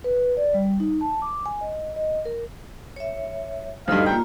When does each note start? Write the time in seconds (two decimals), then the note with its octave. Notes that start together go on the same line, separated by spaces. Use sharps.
0.04 B4
0.37 D5
0.54 G3
0.80 D#4
1.01 A5
1.22 D6
1.46 G#5
1.61 D#5
1.96 D#5
2.25 A#4
2.96 C#5 E5
3.88 D2 G2 D#4 A4 D#5 F5
4.06 A#3 F4 G5 A#5